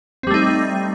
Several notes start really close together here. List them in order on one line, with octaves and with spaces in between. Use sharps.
C4 G3 A3 D#4